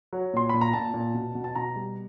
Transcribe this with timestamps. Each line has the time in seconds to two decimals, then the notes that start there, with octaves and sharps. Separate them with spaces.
0.13 F#3
0.34 A#2 C6
0.49 A#2 B5
0.61 A#5
0.73 A#2 A5
0.94 A#2
1.14 B2
1.35 B2
1.44 A5
1.55 B2 A#5
1.76 G3